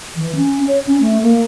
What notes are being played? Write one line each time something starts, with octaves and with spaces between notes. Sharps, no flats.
E3
C#4
C#5
C#4
A3
A#3